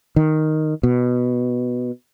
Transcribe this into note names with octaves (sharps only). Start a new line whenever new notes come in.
D#3
B2